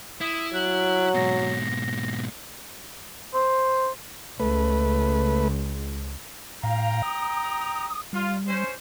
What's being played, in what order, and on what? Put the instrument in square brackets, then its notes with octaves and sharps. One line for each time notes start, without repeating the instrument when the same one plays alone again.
[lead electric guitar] E4 [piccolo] D#6
[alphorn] F#3 [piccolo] F#6
[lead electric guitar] G#2 B2 [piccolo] A#6
[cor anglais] C5
[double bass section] C#2 [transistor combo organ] A3 B4
[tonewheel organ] A2 F5 [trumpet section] G5 A#5
[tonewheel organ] D#6
[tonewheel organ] G3 [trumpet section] F4
[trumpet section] C#4 C5